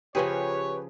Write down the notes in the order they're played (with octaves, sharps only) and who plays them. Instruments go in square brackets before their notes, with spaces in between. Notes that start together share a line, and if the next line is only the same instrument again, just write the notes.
[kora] C#3 F3 G#4 [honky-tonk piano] G4 B4 [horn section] C#5